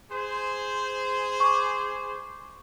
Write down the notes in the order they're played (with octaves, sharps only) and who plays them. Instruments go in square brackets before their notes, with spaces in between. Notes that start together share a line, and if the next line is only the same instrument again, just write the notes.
[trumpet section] G#4 C5
[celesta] C#6 D6